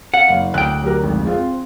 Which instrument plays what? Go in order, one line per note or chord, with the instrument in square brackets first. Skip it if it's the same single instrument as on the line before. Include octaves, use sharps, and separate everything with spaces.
[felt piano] F5 [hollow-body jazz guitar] F#5
[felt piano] F#1 F5
[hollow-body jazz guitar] D2 G5 [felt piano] F#6
[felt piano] F#3 G4 A#4
G#1 F2
C4 F4 G#4